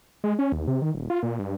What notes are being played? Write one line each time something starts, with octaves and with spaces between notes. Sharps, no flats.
G#3
C#4
D#2
C3
D#3
D#1
F4
A#2
G2